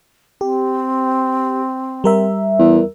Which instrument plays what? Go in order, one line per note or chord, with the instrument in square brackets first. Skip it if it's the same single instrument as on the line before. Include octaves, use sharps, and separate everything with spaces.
[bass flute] C4 [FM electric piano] G4
[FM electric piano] G3 A#4 E5
[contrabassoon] E2